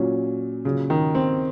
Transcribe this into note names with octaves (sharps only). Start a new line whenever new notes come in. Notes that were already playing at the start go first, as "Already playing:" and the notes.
Already playing: A#2 F#3 C#4
A#2 C#3 F#3 C#4
D#3
C4